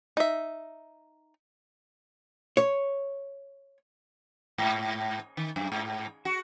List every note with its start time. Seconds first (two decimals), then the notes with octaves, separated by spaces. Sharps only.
0.17 D#4 E5
2.57 C#5
4.58 G#2
5.37 D#3
5.56 F#2
5.72 G#2
6.25 F#4